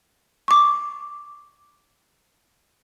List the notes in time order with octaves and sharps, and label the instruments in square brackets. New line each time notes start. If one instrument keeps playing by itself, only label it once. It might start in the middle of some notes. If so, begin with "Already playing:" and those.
[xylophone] C#6 D6